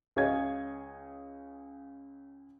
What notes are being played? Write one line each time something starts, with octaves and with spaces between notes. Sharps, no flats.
C#2 G#4 C#5 D#5 F5 G#6